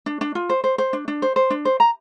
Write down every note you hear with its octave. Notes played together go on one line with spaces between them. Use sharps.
D4
D4
F4
C5
C5
C5
D4
D4
C5
C5
D4
C5
A#5